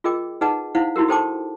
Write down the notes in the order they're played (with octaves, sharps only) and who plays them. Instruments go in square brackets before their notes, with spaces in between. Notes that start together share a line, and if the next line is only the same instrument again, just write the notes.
[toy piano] F4 G#4 A#4 D#5 G5 D6
D#4 G#4 B4 D#5 F#5 A5
D#4 E4 C5 F5 F#5
D#4 E4 F#4 G4 A#4
G4 A4 C5 G5 A5 D6